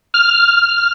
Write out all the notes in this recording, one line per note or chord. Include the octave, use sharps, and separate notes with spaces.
F6